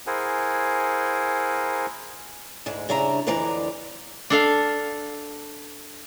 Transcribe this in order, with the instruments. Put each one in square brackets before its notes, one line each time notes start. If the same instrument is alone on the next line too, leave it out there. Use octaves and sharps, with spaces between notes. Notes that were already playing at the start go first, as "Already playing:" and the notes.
[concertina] E4 G#4 A#4 C5 F#5 G#5
[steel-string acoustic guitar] D2 G#2 G#3
G2 C#3 D4 E4 E5 A#5
F2 D3 E3 G#3 D5 A#5
[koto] D4 A4 F5